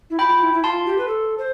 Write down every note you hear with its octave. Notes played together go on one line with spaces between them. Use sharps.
E4
F4 G5 B5
E4
E4
F4 A5 C6
G4
B4
A4
C5